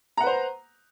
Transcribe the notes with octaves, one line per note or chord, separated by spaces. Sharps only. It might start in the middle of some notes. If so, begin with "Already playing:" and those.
B4 C5 F#5 A#5